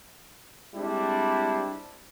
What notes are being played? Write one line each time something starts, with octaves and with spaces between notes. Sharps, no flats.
G3 G#3 C4 D4 E4